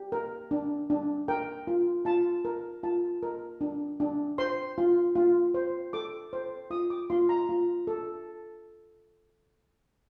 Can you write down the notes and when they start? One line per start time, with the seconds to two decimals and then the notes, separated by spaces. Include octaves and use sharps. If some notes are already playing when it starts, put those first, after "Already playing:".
Already playing: G4
0.12 A#4
0.51 D4
0.90 D4
1.28 A#4 G5
1.67 F4
2.05 F4 A5
2.45 A#4
2.83 F4 A5
3.23 A#4
3.61 D4
4.00 D4
4.38 C5 C6
4.78 F4
5.15 F4
5.54 C5
5.93 A4 D6
6.33 C5
6.70 F4 D#6
6.90 D6
7.10 F4 C6
7.29 A#5
7.49 F4
7.87 A4